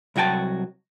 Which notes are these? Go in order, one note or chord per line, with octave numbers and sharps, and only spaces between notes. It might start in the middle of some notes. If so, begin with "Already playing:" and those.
C2 F#3 F#4 G5 A5